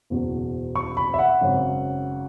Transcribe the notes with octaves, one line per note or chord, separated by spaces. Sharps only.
F#1 E2 B2
C#6
B5
E5
F#5
G#1 F#2 C#3